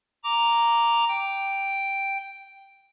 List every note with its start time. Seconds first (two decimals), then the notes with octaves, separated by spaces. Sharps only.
0.24 A#5 D6
1.08 G5